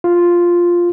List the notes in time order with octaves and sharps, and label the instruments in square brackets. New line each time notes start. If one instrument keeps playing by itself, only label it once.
[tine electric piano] F4